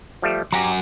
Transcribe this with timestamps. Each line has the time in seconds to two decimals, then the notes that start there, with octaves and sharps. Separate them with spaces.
0.22 F3 G3 A3
0.52 F#3 G4 F#5 G#5 A#5